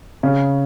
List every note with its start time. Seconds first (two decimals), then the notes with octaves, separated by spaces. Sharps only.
0.23 C#3